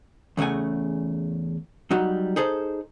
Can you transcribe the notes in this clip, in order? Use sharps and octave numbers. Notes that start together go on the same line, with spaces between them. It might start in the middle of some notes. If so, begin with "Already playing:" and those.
E2 C#3 A3 F#5 G#5
F#3 G3 D#4 F#4
D#4 G#4 A4 C5